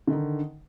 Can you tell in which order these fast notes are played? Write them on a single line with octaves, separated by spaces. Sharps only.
D3 D#3 D#4